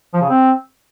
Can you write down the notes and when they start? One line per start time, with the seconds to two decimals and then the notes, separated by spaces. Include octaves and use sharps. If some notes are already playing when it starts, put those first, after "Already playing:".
0.14 F3
0.21 C#3
0.29 C4